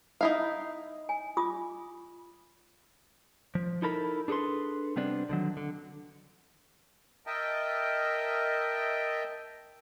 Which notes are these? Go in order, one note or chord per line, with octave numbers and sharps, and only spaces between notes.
D#4 E4 F5
G#5
F4 D6 D#6
F3
D#4 E4 A4 A#4 B5
D4 G#4 A4 B4 C6
C3 G3 B3 C4 D4
D3 D#3 F#3
D3
A#4 D#5 E5 G5 A5